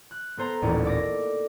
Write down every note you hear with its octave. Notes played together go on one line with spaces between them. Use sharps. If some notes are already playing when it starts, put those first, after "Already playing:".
F#6
B3 A4 C5 A#5 G6
D#1 A1 D#2 C#4 D5
A4 D6 A#6